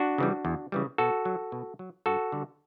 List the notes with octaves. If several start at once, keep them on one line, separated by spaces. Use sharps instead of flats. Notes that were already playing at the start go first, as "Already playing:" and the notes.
Already playing: D4 F#4
C#3 E3 G3
E2
C#3 E3 G3
B2 F#4 A4
F#3
B2
F#3
G2 F#4 A4
D3 G3